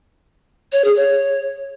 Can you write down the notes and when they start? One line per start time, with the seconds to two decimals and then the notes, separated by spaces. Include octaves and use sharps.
0.72 C#5
0.84 G#4
0.96 C#5